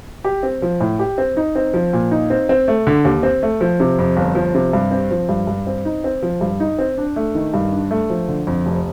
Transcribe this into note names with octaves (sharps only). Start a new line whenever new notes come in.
G4
C4
F3
A2
G4
C4
D#4
C4
F3
A#2
D#4
C4
C4
A3
D3
D#2
C4
A3
F3
C3
F2
G1
F3
C3
G2
C4
F3
G2
G2
C4
D#4
C4
F3
G2
D#4
C4
D4
A3
D#3
G2
D4
A3
F3
D3
F2
F1